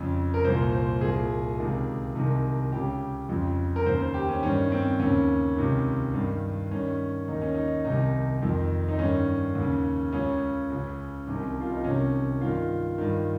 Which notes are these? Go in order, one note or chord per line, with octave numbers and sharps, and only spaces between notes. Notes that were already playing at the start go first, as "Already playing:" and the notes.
Already playing: F2 C#3
A#4
C2 A#2 C5
C5
C2 A#2 G#4
C#2 C3 D#3
C2 C3 D#3
C#2 C#3 G4
F2 C#3
A#4
D#2 C#3 C5
C5
G4
C#4
G2 D#3 C#4
C4
D#2 C#3 C#4
C#2 C3 D#3
G2 D#3
G2 D#3 C#4
D#2 D#3 D#4
C#4
D#4
C2 C3 D#3 D#4
F2 D#3
D#4
G2 D#3 C#4
D#2
C#3
C#2 C#3 C#4
C#2 C#3
C2 C3 D#3
F4
D#4
C2 C3 D#3 C#4
G2 D#3 F4
G2 D#3